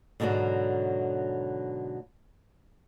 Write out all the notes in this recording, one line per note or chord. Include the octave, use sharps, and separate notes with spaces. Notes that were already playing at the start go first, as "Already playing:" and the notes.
G#2 B2 D3 D#3 F#3